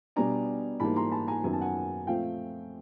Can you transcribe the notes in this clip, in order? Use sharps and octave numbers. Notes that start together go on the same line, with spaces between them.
B2 G3 B3 D4 G#5 A#5
G#2 E3 G3 A#3 A5 B5
A#5 C6
A5 B5
G#5 A#5
F#2 D#3 F#3 B3 G#5
A5
F#5 G#5
A#2 F3 A3 C4 F5 G5